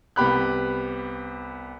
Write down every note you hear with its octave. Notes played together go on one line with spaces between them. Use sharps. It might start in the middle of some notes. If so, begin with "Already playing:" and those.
C2 B3 G4 B5 F#6